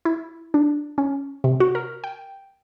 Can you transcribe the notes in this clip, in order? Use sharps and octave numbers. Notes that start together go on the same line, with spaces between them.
E4
D4
C#4
C3
F#4
A#4
G5